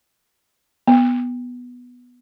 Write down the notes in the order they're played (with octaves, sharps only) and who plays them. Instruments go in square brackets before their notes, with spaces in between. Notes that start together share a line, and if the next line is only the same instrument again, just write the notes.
[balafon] B3